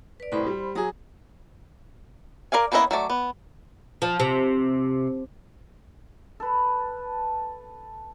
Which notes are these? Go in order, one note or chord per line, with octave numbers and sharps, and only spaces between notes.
B4 D5
C2 A2 C5 B5 C6
G3
F#3 G#4 A#5 D#6
A#4 D5 F5 G#5
A#3 B3 C#4 E4 D#5
F#3 A3 D5
B3
F3
C3
A4 B4